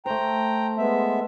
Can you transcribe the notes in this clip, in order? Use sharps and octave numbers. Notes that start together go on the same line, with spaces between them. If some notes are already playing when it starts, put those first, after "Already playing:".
A3 C5 G5 A#5
G#3 B3 E5